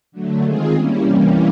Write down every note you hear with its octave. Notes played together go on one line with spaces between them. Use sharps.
D3 F#3 A3
D#3 G#3 C4 F4 G#4
G3 A#3 C#4 E4
C3 E3 G3 A#3 C#4